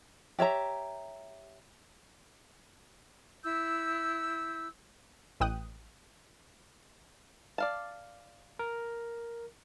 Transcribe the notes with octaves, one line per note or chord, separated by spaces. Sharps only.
G4 C#5 E5 A#5
E4 E6 G6
A1 E3 G5 D#6 F#6
D5 F5 A5
A#4